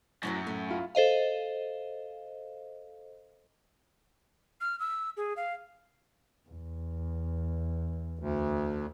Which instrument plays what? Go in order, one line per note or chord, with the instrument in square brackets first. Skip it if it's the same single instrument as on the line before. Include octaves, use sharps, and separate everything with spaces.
[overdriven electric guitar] F#2 [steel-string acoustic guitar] A2 F3 F#3
[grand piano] A2 [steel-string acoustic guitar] A3
[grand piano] E4 F4
[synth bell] A4 C5 D#5 F5
[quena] F6
E6
G#4
F5
[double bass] E2
[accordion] D2